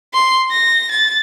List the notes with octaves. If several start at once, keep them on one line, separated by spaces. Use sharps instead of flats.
C6
A#6
A6